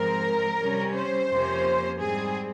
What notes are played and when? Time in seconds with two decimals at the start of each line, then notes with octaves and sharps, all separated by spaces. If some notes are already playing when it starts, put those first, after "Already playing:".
Already playing: G#2 F3 G#3 C4 A#4
0.59 C3 G3 C#4
0.94 C5
1.29 F2 C3 F3 A#3 C#4
2.00 G#2 G3 C4 G#4